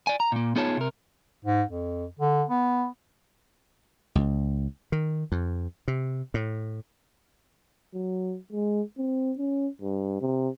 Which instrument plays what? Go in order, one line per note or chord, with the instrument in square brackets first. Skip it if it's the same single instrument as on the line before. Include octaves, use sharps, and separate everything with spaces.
[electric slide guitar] D5 G#5
A#5
A#2 A#3
B3 D#4 F4 G#4 C#5 A5
C3 A#4
[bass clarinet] G#2
F2
D3
B3
[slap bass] C#2
D#3
F2
C3
A2
[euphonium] F#3
G#3
C4
C#4
G2
C3